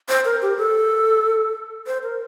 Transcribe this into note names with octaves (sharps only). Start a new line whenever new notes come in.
C5
A#4
G4
A4
C5
A#4